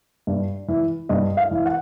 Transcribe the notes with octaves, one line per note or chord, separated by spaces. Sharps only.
G2
E3
G2 D#5
F5
E3
F#5